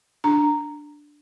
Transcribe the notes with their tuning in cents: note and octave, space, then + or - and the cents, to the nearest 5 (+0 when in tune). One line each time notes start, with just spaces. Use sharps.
D4 +0 A#5 -10